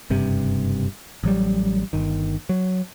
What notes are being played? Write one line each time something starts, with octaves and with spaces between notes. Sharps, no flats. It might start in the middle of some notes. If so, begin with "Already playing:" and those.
F#1 G2 C3
A1 F#3 G3
G1 D#3
F#3